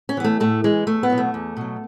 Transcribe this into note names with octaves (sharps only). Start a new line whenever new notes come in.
C#4
E3 B3
A3
A2 A3
E3 G#3
E2 A3
B3
B2 F#3
A3
E2
B2 F#3